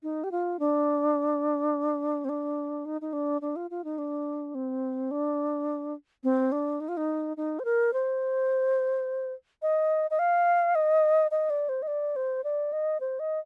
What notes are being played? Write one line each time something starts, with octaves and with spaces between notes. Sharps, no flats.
D#4
G4
F4
D4
C4
D4
D#4
D#4
D4
D4
F4
F4
D#4
D4
C4
D4
C4
D4
D#4
F4
D#4
D#4
C5
A#4
C5
D#5
D#5
F5
D#5
D#5
D5
C5
D#5
D5
C5
D5
D#5
C5
D#5